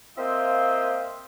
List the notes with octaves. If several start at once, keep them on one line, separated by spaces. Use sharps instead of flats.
A#3 C4 F4 D#5 E5 G5